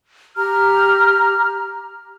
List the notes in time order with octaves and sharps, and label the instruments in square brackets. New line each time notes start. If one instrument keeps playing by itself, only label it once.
[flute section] G4 A#5 F6